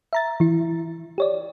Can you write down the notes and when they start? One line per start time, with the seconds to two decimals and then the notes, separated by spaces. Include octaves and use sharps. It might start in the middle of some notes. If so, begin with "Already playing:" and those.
0.13 E5 A#5 A6
0.40 E3 E4
1.18 G4 C#5 D5